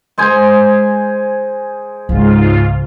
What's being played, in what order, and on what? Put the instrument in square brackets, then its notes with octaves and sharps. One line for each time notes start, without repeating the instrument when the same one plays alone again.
[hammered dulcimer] G#3 C5 G#5
[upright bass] C#2 [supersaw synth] G#2 F4